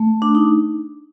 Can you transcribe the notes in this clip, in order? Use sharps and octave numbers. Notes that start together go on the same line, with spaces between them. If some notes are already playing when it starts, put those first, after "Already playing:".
Already playing: A3
D4
D#4